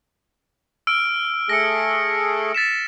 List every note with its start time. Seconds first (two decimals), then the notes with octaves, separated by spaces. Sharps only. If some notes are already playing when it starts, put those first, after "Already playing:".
0.87 E6 F6 D7
1.49 A3 G#4 A4 A#6 C#7
2.54 A6 B6 E7